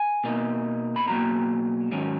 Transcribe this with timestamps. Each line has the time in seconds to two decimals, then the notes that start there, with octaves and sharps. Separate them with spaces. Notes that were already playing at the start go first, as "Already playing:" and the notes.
Already playing: G#5
0.24 B2 A#3 D#4
0.96 B5
1.08 B2 F#3 A#3 A#5
1.91 G#2 D#3 F#3 C#4